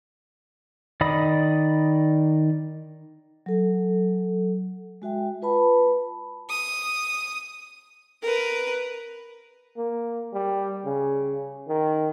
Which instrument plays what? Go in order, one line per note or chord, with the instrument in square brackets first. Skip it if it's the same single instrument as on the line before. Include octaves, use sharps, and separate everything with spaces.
[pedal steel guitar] D#3 D5 D#5 B5 D#6
[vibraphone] F#3 A4
G#3 F#4 E5 G5
F4 B4 A5 B5
[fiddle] D#6
A#4 B4
[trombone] A#3
G3
C#3
D#3